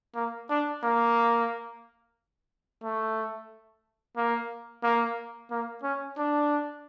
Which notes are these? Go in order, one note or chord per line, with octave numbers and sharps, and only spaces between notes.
A#3
D4
A#3
A3
A#3
A#3
A#3
C#4
D4